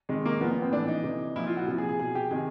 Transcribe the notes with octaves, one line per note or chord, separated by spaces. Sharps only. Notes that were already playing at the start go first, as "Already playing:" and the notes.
C3 D#3 G#3
A#3
A#2 F3 B3
B3
C4
A2 E3 D4
D#4
C3 E3
A#2 F3 E4
F4
F#4
C3 F3
G#4
G#4
B2 G#4
G4
C3 D#3 G#4